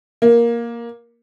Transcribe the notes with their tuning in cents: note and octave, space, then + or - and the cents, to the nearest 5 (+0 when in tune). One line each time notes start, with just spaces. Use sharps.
A#3 +10